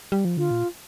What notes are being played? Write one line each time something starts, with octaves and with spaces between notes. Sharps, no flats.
G3
F3
D3 F4
A#2